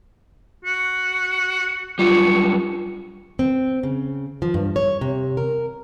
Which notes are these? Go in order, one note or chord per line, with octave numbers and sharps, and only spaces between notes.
F#4
F#2 C3 G3 F4 C#6
C4
C#3
F3
G2
C#5
C3
A#4